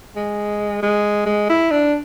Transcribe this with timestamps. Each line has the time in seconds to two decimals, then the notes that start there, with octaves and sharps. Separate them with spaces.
0.16 G#3
0.82 G#3
1.26 G#3
1.49 E4
1.71 D4